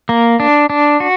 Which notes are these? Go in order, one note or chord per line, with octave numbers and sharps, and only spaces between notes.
A#3
D4
D4
F#4